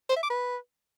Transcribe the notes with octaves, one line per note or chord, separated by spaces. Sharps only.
C5
E5
D6
B4